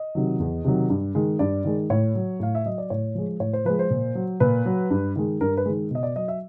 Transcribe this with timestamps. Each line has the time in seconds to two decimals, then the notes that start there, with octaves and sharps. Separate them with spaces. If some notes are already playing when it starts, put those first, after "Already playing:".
Already playing: D#5
0.15 C3 D#3 F#3
0.40 E2
0.65 C3 D#3 F#3
0.90 G2
1.15 D#3 G#3
1.39 G2 D5
1.65 D#3 G#3
1.90 A2 C#5
2.15 F#3
2.40 A2 F5
2.55 E5
2.65 F#3 D#5
2.78 D5
2.90 A2 C#5
3.15 F3 G#3
3.40 A2 C#5
3.53 C5
3.65 F3 G#3 B4
3.79 C5
3.90 A#2
4.15 F#3
4.40 A#2 B4
4.66 F#3
4.90 G2
5.16 D#3 G#3
5.41 G2 A#4
5.57 B4
5.66 D#3 G#3
5.91 B2 D#5
6.03 D5
6.16 F#3 D#5
6.28 E5